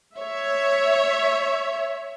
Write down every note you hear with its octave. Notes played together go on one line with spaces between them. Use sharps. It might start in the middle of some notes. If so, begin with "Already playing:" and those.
C#5 E5